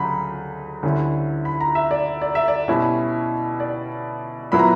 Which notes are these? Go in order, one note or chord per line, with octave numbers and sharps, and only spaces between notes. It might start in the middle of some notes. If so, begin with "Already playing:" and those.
Already playing: D2 C#3 F#3 A#5 B5
D2 D3 G3 C#4 E4
B5
A#5
E5
D5
D5
E5
D5
B2 G3 C#4 E4
D5
A#2 F#3 B3 E4 B5
A#5